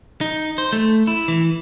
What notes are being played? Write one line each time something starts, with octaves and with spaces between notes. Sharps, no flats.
D#4
C5
A3
E4
E3